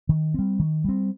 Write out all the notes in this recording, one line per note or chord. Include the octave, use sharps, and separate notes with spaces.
D#3
G3 C4
D#3
G3 C4